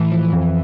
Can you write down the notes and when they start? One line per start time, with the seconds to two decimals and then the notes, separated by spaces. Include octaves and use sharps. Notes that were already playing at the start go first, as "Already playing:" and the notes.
Already playing: A2 E3
0.12 F3
0.33 F2